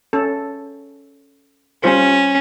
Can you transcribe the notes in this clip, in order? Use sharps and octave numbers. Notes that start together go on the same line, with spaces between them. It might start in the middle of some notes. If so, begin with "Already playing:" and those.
C#4 A4
G3 C#4 F4 C5